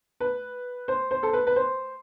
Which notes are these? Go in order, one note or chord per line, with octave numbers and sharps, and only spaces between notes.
B4
C5
C5
A4
B4
B4
C5